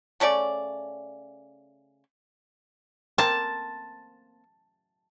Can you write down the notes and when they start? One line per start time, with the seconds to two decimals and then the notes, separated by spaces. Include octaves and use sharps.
0.20 C#3 A3 C#4 D5
3.18 A#3 C4 A5